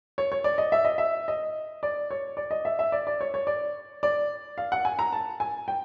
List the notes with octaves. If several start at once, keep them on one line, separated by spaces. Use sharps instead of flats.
C#5
C#5
D5
D#5
E5
D#5
E5
D#5
D5
C#5
D5
D#5
E5
E5
D5
D5
C#5
C#5
D5
D5
F5
F#5
G#5
A#5
A5
G#5
G5